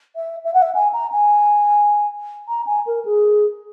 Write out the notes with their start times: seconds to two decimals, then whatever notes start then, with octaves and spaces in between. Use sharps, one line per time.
0.16 E5
0.44 E5
0.54 F#5
0.62 E5
0.74 G#5
0.93 A#5
1.12 G#5
2.48 A#5
2.66 G#5
2.86 A#4
3.05 G#4